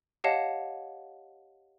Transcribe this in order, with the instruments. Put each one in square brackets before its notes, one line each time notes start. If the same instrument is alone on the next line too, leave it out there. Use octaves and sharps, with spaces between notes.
[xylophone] G4 C#5 D#5 F5 F#5 A5